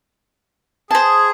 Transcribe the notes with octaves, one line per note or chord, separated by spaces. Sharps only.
G#4 C5 A5